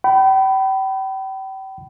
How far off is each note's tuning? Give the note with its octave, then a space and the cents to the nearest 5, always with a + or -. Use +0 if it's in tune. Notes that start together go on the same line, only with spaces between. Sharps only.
G5 -35 B5 +10